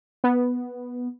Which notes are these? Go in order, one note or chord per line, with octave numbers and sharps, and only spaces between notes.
B3